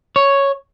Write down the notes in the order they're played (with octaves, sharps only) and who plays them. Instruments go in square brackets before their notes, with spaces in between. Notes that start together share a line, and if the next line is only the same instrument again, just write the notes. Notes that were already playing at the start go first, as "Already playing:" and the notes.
[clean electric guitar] C#5